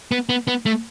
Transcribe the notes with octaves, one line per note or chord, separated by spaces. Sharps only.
B3
B3
B3
A3